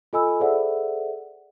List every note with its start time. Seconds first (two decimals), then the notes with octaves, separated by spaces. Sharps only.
0.13 F4 A4 D#5 G#5 B5 E6
0.40 G#4 A4 C5 D5 E5 F#5